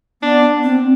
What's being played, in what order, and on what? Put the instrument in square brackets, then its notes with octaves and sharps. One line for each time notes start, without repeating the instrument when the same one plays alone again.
[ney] B3 [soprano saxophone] D4
[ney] C4